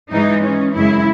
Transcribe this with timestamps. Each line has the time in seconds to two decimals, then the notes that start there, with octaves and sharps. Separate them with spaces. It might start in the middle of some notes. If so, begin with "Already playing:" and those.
0.11 G#2 E3 G#3 D#4
0.42 C#4
0.74 F#2 C#3 G#3 E4